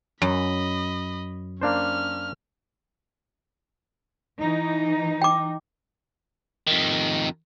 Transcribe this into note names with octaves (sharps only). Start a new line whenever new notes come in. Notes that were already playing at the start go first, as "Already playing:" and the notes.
F#2 D#5 B5
A#3 C#4 D4 C5 F6
E3 D#4
G5 D6
F2 D#3